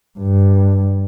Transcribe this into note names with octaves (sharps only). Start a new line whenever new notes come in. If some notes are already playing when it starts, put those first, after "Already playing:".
G2